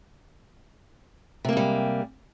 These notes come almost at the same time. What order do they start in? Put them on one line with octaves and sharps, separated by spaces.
C3 A#3 G#3 G3